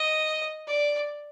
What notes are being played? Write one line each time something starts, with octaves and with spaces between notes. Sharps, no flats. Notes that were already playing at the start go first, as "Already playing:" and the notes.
Already playing: D#5
D5